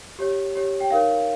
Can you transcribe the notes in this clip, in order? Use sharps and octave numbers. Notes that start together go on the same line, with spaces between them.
G4 C#5
G4 C#5
G5
D#4 A#4 C#5 F5